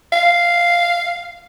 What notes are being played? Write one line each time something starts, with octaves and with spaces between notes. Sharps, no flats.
F5